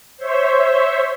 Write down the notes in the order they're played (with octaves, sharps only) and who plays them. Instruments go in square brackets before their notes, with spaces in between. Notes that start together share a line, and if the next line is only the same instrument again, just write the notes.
[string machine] C5 C#5 E5